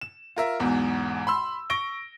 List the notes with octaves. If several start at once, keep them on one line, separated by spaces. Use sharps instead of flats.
E7
F4 A#4 E5
B1 E2 G#2 B2
B5 C6 E6
C#6 A#6 D7 G7